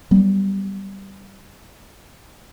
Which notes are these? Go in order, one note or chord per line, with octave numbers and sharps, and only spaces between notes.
F#3 G3 B3